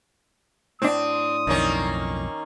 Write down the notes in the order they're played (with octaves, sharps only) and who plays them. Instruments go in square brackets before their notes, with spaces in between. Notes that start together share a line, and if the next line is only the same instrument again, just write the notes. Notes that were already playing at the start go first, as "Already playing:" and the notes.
[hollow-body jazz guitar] A2 D4 [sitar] C4 [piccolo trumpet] D#6
[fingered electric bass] B1 F2 [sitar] D#3 A#3 C#4